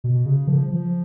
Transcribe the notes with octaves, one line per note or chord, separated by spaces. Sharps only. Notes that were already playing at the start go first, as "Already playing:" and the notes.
B2
C#3
F3
F3